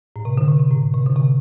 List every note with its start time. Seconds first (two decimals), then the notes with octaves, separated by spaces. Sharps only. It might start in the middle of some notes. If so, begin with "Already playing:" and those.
0.16 A2
0.25 C3
0.38 D3
0.48 C3
0.59 C3
0.71 A2
0.94 C3
1.06 D3
1.16 C3